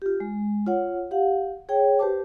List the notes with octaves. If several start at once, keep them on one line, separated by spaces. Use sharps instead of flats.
F4 G4
G#3
F4 C#5 F#5
G4 F5 F#5
G#4 C#5 G5
G4 B4 C5 A5 D6